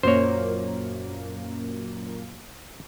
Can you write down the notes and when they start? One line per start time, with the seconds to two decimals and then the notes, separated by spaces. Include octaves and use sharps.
0.03 F#2 A#2 A#3 C5 C#5